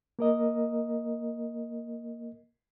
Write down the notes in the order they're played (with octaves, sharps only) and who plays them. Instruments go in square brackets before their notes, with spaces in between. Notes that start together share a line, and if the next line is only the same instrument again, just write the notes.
[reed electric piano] A#3 A#4 D#5